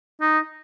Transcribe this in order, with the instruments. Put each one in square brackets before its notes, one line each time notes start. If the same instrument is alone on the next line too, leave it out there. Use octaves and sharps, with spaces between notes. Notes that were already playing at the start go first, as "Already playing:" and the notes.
[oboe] D#4